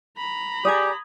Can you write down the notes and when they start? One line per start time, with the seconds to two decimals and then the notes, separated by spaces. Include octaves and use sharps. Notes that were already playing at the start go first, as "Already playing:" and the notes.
0.17 A#5 B5
0.65 G4 G#4 D5 D#6 G#6